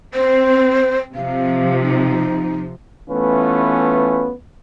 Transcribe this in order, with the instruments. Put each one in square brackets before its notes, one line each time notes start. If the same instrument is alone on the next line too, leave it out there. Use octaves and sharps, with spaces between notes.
[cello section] C4 [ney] C5
[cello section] C3 F3 [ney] F5
[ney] D#4
[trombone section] E3 A3 B3 C#4 F4 B4